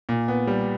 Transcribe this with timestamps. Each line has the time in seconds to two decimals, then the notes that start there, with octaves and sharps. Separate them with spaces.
0.09 A#2
0.28 B3
0.47 G3